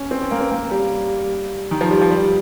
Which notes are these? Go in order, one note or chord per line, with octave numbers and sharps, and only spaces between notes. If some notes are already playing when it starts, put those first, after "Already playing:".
Already playing: C#4
C4
C#4
A#3
C4
A#3
G3
D#3
F3
G3
F3
G3